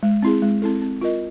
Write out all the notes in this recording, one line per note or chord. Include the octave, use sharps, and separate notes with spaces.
G#3
C4 E4 G#4
G#3
C4 E4 A4
C4
F4 A#4 D#5